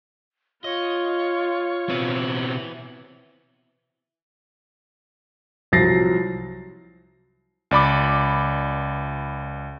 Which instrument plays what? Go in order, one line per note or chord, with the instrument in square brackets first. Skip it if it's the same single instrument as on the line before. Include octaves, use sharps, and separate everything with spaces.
[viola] F4 [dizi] C#5 [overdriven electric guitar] D#5
[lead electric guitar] B2 C4 [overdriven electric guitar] E4 B4
[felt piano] C2 F3 F#3 A6 A#6 C7
[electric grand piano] C#2 D5 B5 D6